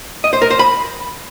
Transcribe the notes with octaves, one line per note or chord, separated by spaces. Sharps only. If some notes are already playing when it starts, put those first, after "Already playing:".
D#5
C5
A#4
C5
B5